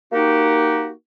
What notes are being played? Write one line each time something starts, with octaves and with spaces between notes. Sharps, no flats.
A#3 D#4 F#4 G4